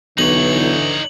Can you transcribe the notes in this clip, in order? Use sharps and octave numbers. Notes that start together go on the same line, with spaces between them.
B1 D3 E3 D#4 C#5 F#7